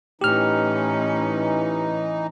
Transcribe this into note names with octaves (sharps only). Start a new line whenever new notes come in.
A2 E3 C#4 D#4 G4 F6